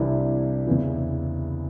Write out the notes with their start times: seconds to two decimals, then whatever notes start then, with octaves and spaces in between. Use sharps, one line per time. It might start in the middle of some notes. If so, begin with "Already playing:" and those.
Already playing: C2 C3 E3 D4 E4
0.67 E2 C#3 E3